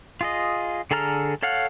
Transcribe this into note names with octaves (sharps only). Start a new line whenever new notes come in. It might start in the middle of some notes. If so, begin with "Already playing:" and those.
F4 G#4 D#5
D3 G#4 A4 A#5 F6
A4 C#5 F5 F#5 F6